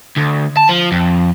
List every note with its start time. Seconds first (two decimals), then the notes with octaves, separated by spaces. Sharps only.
0.16 D2
0.57 A5
0.69 F3
0.92 F2